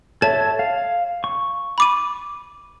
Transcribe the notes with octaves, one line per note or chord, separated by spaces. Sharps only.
A4 C#5 E5 A5
F5
C#6
B5 D6 D#7